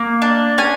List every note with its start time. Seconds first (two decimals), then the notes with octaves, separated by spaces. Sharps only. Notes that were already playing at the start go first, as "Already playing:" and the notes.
Already playing: A#3
0.22 D4
0.58 C#4 G#5